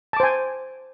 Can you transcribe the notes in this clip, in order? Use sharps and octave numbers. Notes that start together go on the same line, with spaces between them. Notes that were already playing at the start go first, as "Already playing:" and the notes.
C5 G#5 A5 D6